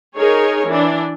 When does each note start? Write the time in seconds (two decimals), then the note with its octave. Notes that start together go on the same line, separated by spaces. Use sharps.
0.17 D#4 G#4 A#4 C#5
0.68 E3 D4